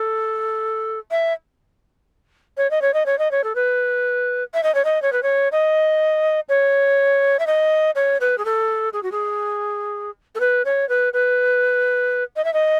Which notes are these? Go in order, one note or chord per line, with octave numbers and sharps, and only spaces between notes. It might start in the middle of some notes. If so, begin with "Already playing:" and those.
Already playing: A4
E5
C#5
D#5
C#5
D#5
C#5
D#5
C#5
A4
B4
E5
D#5
C#5
D#5
C#5
B4
C#5
D#5
C#5
E5
D#5
C#5
B4
G#4
A4
G#4
F#4
G#4
A4
B4
C#5
B4
B4
D#5
E5
D#5